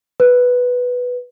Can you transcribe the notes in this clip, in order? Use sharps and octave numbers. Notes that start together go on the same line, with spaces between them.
B4